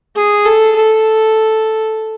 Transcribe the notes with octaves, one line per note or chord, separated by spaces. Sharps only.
G#4
A4
A4